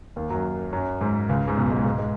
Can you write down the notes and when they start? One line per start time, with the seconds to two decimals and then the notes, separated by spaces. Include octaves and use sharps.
0.16 D#2 D#3
0.30 F#2 F#3
0.73 F#2 F#3
1.01 G#2
1.29 C#2 C#3
1.48 G#2
1.57 B1 B2
1.71 G#2 G#3
1.85 G#2 G#3
1.99 G#3